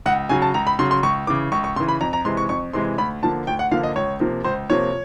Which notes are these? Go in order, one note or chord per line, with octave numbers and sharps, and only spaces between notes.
C#2 F#5
C#3 F#3 G#5
A5
C#2 A#5
B5
C#3 F#3 C6
C6
C#2 C#6
C#3 E3 D6
C#2 C#6
C#6
C#3 E3 C6
B5
F2 A#5
A#5
C3 E3 G#3 C6
C#6
F2 C#6
C3 E3 G#3 C6
D2 B5
D3 F3 A#3 A5
D2 G5
F#5
D3 F3 A#3 F5
D#5
C#2 C#5
C3 F3 A#3
C#2 C5
C3 F3 A#3 C#5